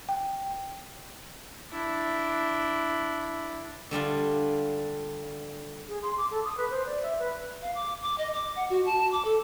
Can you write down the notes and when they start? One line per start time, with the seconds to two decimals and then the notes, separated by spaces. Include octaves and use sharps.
0.09 G5
1.70 D4 E4
3.91 D3 G3 D4 F4
5.88 G#4
6.02 C6
6.17 D6
6.30 A4
6.44 D#6
6.57 B4
6.70 C5
6.85 D5
7.02 E5
7.19 B4
7.62 F5
7.75 D6
8.02 D6
8.18 D#5
8.33 D6
8.56 F#5
8.70 F#4
8.86 A5
9.12 D6
9.25 A4